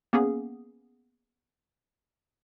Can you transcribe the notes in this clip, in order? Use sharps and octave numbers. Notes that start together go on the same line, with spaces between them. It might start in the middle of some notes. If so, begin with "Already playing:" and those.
A#3 B3 C#4 G#4